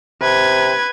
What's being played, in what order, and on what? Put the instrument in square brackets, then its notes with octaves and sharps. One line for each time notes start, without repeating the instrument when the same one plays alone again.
[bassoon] C3 [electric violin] B4 G#6